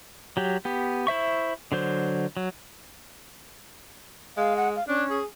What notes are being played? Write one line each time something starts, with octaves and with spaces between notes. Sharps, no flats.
F#3 G4
B3 G4
E4 C5 E5 C#6
D3 F#3 C5
F#3
G#3 F5
F#5
F5
C#4 D4
G#4